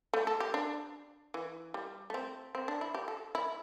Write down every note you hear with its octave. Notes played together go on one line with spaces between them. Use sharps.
A3
A4
G4
D4
E3
G3
A3
C4
C4
D4
E4
G4
A4
E4